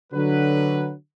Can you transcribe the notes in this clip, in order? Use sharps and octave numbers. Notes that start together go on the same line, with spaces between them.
D3 F#3 B4